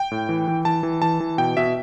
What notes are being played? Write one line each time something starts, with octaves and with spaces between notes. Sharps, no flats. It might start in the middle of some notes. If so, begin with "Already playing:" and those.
Already playing: G5
A2
E3
E3
E3 A5
E3
E3 A5
E3
B2 G5
B2 E5